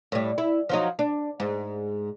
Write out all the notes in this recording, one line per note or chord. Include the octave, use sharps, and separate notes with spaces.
A2 G3
E4
F3 F#3 D#4
D4
G#2